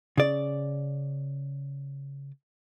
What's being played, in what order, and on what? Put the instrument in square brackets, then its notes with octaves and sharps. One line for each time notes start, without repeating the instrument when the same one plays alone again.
[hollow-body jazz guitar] C#3 D5